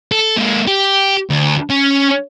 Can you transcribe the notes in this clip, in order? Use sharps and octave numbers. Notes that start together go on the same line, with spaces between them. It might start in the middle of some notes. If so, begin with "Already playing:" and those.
A4
G#3 A#3
G4
D2
C#4